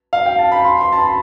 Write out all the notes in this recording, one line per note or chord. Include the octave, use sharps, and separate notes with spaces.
F5
G5
A5
B5
C6
C6
A5
B5